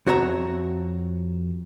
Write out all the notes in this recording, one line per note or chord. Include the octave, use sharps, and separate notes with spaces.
F2 F#4 C#5 E5 A#5